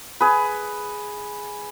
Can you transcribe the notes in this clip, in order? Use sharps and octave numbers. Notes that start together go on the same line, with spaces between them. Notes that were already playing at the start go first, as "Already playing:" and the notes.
G#4 B4